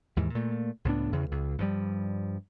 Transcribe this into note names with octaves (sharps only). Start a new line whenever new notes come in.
D#2 G#2 E3
A#2 A3
C#2 A2 B3 D4
E2 C#3 E3
C#2
G2 F3 G3